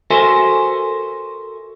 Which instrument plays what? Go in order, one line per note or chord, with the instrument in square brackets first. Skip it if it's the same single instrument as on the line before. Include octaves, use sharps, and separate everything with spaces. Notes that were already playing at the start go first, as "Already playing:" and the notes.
[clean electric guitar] F#4 A4 A#4 C5 E5 G#5